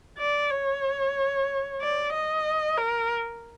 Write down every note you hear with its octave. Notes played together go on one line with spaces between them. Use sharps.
D5
C#5
D5
D#5
A#4